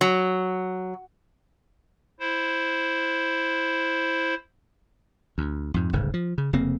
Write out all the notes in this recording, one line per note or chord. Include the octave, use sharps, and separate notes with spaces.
F#3
E4 C5
D2
F2 G#2
D1 G1 G#2 C#3
F3
C#3
F1 C#3 A#3 C4